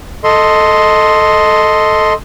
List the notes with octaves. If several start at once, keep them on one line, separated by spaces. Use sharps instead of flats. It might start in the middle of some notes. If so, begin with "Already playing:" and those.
A4 D#5 C6